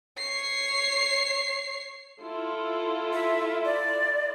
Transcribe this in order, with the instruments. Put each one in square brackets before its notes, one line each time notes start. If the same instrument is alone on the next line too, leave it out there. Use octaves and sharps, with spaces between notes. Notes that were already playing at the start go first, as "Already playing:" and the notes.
[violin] C#5 C7
[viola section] E4 F4 A4
[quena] E5
D5